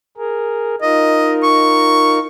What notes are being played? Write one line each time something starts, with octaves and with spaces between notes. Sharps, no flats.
G#4 A#4
D#4 F4 A#4 D#5
C#6